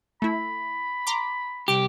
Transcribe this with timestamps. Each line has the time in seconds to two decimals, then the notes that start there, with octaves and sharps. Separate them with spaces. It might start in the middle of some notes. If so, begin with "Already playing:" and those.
0.22 A3 E4 B5
1.07 A#5 C6 D6
1.68 C2 G4 D7